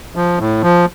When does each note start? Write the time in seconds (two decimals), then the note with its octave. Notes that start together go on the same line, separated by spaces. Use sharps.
0.16 F3
0.39 A2
0.62 F3